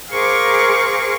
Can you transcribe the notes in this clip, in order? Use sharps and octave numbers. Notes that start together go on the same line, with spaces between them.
G#4 A#4 C5 F5 C#6 D6